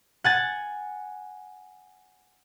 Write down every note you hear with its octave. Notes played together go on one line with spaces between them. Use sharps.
F#5 G#5 A6